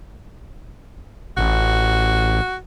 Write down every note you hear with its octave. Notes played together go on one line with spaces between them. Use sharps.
A1 F#4